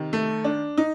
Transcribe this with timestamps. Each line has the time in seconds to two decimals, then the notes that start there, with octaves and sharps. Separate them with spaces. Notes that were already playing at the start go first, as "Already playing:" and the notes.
Already playing: C3 D#3
0.13 A3
0.44 D4
0.77 D#4